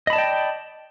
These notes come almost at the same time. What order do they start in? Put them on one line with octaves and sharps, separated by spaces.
D#5 B5 A5 D5 G5